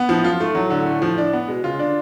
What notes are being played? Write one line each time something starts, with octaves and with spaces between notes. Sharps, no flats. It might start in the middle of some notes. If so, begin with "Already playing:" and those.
Already playing: B3
A2 F3
F#2 F4
G#2 A3
A2 F#3
D3
A3
F3
D4
B3
B2 G#3
C#3 F4
D3 D4